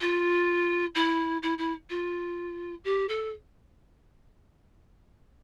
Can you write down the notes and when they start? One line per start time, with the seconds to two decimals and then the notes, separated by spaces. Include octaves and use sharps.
0.01 F4
0.95 E4
1.43 E4
1.58 E4
1.90 F4
2.84 G4
3.09 A4